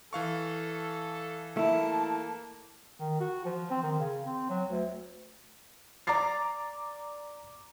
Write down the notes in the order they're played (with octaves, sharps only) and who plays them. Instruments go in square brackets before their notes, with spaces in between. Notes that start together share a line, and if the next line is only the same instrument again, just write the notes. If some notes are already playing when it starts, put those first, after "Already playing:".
[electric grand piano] E3 F5 C#6 [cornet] A4
[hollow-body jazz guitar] A3 E4 [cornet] A#3 [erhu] A5
[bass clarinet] D#3
F#4
F3
C4
D#3
C#3
C4
F#3
D2
[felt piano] D5 A#5 D6 A6 C7